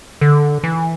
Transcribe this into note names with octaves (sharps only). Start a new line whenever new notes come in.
D3
E3